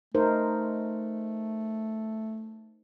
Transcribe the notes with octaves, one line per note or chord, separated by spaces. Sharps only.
A3 D#4 A#4 C5